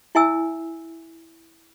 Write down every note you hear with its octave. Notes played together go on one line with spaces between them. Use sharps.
E4 E5 G#5 E6